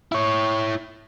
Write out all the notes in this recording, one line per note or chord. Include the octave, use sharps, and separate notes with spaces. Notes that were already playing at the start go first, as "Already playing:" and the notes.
E4 C#5